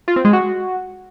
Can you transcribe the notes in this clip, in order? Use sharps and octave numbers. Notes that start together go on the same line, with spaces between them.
F4
C4
G#3
F#4